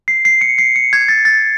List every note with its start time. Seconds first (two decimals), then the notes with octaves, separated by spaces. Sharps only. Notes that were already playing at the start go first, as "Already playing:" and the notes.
0.08 C7
0.25 C7
0.41 C#7
0.58 C7
0.76 C#7
0.93 G#6
1.09 A6
1.25 A6